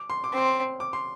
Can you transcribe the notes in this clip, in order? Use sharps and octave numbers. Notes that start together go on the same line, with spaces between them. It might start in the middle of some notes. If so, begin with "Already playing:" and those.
Already playing: D6
C6
D6
C4 C6
D6
C6